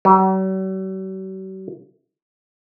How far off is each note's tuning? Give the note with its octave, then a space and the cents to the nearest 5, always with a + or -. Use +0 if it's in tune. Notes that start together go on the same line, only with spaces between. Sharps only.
F#3 +45